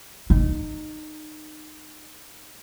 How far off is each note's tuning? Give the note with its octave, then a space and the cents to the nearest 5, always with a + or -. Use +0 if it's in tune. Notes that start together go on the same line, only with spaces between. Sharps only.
D#4 -20